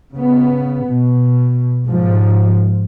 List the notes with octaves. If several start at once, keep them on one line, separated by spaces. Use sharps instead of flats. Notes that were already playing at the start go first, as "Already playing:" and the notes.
C#3 B3
B2
G#2 F3